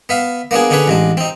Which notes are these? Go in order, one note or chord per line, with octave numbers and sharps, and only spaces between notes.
B3 E5 F5
A#3 B3 D4 G#4
D3 C#4 D4 G#4 B4
A1 G#3 D4
C4 D#4